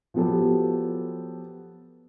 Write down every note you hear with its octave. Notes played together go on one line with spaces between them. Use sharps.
F3 F#3 B3 G4 A4